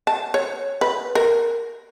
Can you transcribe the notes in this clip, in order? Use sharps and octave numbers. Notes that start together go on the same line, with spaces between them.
A5
C#5
B4
A#4